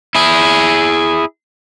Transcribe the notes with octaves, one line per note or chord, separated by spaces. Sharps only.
E4 G#4